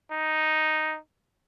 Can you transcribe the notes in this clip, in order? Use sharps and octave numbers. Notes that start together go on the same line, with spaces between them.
D#4